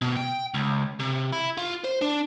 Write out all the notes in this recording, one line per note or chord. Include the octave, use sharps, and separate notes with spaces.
B2
G5
C#2
C3
E4
F4
C5
D4